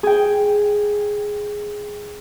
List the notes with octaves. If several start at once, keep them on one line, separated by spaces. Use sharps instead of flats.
G#4 G5